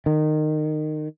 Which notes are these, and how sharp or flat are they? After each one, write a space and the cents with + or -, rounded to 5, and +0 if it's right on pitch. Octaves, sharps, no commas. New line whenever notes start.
D#3 -20